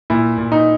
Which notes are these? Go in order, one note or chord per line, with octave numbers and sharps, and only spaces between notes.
A#2 E4
A#2
D#4